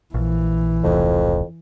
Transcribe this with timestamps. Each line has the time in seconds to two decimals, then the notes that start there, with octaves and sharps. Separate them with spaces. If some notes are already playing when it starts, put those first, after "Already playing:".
0.14 A#1 E3
0.84 E1 C2 F2 A2